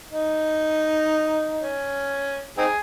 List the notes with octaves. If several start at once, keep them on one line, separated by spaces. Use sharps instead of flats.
D#4
C#4
C4 D#4 G#4